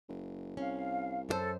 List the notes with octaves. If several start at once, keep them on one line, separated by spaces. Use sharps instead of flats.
F#1
C2 C#4 F5
F#2 F#4 A4 C5